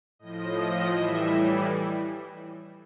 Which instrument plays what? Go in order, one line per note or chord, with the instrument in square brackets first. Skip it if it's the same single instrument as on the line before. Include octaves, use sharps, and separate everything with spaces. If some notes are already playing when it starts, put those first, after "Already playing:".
[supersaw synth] A2 F3 D#5
A2 E3 G3 E5